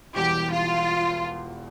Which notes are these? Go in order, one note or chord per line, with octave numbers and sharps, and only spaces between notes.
E1 E2 E3 G3 G4
F4